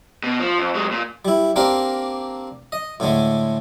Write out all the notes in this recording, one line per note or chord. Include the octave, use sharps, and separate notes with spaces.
B2
F3
F2
F#3 G#3
A#2
G3 E4
A#3 C4 D4 G4 A#4 F5
D#5
A2 D3 G#3 A3